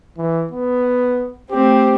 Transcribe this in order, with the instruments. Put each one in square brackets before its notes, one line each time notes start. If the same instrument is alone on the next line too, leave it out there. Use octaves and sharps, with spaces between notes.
[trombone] E3
B3
[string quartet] A3 C4 [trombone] G4